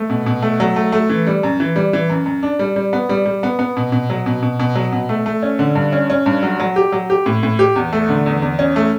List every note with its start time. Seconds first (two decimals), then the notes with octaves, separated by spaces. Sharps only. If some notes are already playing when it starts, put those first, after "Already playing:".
Already playing: A3
0.10 B2
0.26 B2
0.42 A3
0.60 F#3
0.76 A3
0.92 A3
1.10 E3
1.27 G3
1.43 F#2
1.60 E3
1.76 G3
1.93 E3
2.10 F#2
2.26 F#2
2.43 D4
2.59 G3
2.76 G3
2.93 B3
3.09 G3
3.26 G3
3.43 B3
3.59 B3
3.77 B2
3.92 B2
4.10 F#3
4.26 B2
4.43 B2
4.60 B2
4.76 F#3
4.93 B2
5.09 A3
5.26 A3
5.43 C#4
5.59 D3
5.75 G2
5.93 C#4
6.10 C#4
6.26 G2
6.43 F#3
6.60 F#3
6.76 G4
6.92 F#3
7.10 G4
7.26 A2
7.43 A2
7.59 G4
7.76 E2
7.93 A3
8.09 D3
8.26 E2
8.42 E2
8.59 C#4
8.76 A3